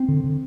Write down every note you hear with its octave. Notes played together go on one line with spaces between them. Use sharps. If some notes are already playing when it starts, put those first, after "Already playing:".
Already playing: C4
D3
D3